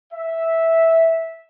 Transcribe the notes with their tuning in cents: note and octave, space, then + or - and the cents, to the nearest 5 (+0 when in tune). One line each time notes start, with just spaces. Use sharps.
E5 -10